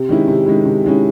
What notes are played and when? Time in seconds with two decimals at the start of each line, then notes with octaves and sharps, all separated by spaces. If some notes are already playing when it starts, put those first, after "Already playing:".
Already playing: C3
0.09 D#3 G#3 C#4 E4
0.28 C3
0.46 D#3 G#3 C#4 E4
0.66 C3
0.84 D#3 G#3 C#4 E4